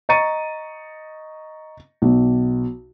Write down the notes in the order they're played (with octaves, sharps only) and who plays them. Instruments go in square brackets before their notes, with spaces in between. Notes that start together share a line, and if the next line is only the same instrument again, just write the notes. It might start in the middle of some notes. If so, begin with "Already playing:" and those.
[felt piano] D#5 A#5 C#6 A6 C#7 D#7
B1